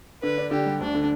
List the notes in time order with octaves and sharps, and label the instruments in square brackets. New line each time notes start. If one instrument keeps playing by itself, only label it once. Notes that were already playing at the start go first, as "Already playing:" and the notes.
[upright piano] D3 [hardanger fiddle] B4
[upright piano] D4
[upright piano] D3 [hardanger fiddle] G4
[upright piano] G3
[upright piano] D2 [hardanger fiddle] D4
[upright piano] D3